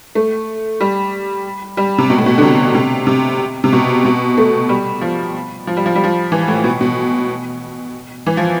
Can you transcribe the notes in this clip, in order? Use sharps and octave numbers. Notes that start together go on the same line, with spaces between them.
A3
G3
G3
C3
B2
A2
B2
D3
C3
C3
C3
C3
B2
B2
A3
G3
F3
F3
G3
F3
G3
F3
E3
A2
B2
B2
E3
F3